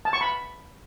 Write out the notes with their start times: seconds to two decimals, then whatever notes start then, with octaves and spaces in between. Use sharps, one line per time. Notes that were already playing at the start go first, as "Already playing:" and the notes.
0.05 A5
0.13 C#6
0.21 B5